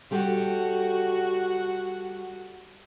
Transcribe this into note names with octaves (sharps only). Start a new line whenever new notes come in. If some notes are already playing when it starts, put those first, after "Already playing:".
G3 F#4 G4 A4